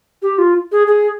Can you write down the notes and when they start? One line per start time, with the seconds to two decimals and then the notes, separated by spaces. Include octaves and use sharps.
0.22 G4
0.38 F4
0.72 G#4
0.87 G#4